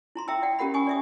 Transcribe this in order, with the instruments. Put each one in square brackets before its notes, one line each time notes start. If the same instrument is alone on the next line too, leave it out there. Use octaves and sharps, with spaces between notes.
[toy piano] E4 A#5 C6
E5 G5 A#5 D#6 E6
D5 F#5 G5
C#4 G4 A#4 F#5 B5
G#5 C#6 D#6
D5 E5 D#6